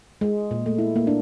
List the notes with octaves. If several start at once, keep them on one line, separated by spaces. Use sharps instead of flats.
G#3
A#2
A3
E4
A#3
D4